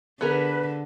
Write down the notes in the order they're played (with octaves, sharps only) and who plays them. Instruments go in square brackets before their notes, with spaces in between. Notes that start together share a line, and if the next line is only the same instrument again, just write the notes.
[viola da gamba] D3 [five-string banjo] B3 G#4 A#4 [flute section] B4